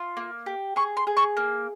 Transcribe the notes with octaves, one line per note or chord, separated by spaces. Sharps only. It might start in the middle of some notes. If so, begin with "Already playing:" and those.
Already playing: F4
A#3
G4
G#4 C#6
C6
G#4
C#6
A#3